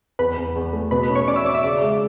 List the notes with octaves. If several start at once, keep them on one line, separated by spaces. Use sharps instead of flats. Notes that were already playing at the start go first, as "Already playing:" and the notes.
E2 B4 B5
E2
E2
A3
B2 B4 B5
B4 B5
C#4
C#5 C#6
C#4 D5 D6
E5 E6
C#4 D5 D6
E5 E6
C#3 D5 D6
G#3